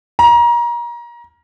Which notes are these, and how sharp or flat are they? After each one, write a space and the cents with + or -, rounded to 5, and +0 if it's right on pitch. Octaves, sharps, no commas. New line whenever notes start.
A#5 +30